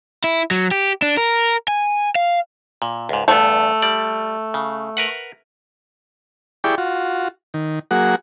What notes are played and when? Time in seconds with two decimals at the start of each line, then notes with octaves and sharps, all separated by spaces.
0.24 E4
0.51 F#3
0.71 G4
1.02 D4
1.17 A#4
1.68 G#5
2.15 F5
2.82 A#2
3.09 C#2 G#2
3.28 E2 G2 A3 B3
3.82 G3 D5
4.54 C#3
4.97 A#4 B4 F#5
6.64 E4 G4 G#4 D5 G5 C#6
6.78 F4 F#4
7.54 D#3
7.91 F#3 A#3 F#4 G#4 F#5